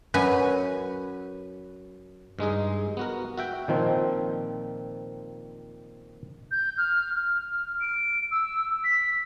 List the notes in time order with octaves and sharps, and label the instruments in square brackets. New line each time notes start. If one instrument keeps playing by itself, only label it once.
[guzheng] F#2 B4 F#5 G#5
[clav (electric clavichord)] G2 G#3 D#4 G#4
B3 F#4 A#4
F#4 E5 G5
A#2 D#3 F3 C4
[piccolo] G6
F6
F6
D7
E6
B6